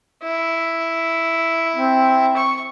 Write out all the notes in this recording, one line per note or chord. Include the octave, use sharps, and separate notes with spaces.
E4
C4
C#6